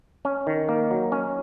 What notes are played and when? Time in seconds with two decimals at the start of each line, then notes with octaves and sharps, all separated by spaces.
0.25 C#4
0.47 D#3
0.69 A#3
0.91 F#3
1.12 C#4